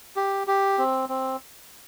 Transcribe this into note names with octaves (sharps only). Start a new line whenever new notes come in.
G4
G4
C4
C4